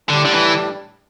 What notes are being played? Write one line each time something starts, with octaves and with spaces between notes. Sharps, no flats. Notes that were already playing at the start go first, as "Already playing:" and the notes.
A2 D3 G3 D4
D3
E3